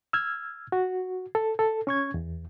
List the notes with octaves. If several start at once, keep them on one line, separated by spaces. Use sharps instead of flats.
E6 F6 G#6
F#4
A4
A4
C#4 C#6 G#6
E2